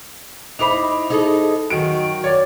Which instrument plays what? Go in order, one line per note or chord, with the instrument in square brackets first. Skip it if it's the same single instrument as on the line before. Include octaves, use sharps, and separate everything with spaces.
[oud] D#4 E4 C5 [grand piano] B5 D6 F7
[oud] D#4 G#4 A4
[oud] F#2 [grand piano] D#3 D7 [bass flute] F#4
[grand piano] C#5 D5